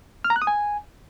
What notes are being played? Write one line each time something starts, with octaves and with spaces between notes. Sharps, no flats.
F6
A#5
F#6
D#6
G#5